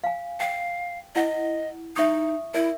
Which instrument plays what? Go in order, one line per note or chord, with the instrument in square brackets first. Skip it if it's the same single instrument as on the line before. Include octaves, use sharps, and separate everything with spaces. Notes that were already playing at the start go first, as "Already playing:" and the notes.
[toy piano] F5 G#5
[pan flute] F5 [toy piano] G5
[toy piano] E4 F#5 [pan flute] D#5
[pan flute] D#4 [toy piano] E5 C#6 D#6
[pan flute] E4 [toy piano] A#4 D5 E5